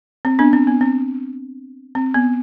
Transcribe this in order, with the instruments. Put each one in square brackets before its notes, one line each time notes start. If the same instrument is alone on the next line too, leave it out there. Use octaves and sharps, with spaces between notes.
[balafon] C4
B3 D4
C4
B3
C4
C4
B3